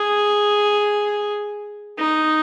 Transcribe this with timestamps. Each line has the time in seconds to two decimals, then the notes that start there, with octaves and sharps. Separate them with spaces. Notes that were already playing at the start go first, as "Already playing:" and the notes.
Already playing: G#4
1.99 D#4